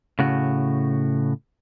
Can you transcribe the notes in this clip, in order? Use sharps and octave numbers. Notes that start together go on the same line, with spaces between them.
A2 C#3 F#4